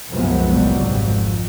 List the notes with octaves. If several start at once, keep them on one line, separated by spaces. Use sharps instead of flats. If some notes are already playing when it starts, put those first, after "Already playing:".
C2 F#2 C3 F3 G#3 B3
F#1 A2 C3 F#3 G3
G#1 F2